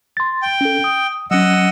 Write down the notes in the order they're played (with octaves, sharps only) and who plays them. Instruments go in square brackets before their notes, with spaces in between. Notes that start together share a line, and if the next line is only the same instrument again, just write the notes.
[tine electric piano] C6 A6
[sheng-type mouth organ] G5
[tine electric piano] C#4 A4
D#6
[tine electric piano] F#3 C#4 [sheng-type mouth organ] D#5 F#5 E6